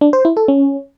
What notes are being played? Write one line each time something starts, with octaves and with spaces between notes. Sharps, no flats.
D4
C5
E4
A4
C#4